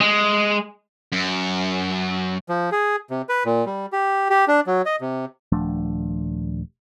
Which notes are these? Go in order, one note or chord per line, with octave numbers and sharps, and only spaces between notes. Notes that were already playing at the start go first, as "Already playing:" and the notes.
G#3
F#2
F3
G#4
C3
B4
A#2
G3
G4
G4
D4
F#3
D#5
C3
D#1 F3 A3 D4